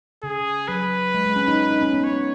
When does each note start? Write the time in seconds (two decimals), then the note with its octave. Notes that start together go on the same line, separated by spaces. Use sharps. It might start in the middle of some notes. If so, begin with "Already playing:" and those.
0.23 C#3 G#4
0.68 F#3 B4
1.14 G#3
1.25 G#3
1.36 C#4
1.47 D#4
1.71 D#4
1.82 C#4
1.93 B3
2.04 C#5